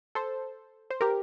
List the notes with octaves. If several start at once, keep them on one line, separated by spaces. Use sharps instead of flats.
A4 C5
C5
G4 A#4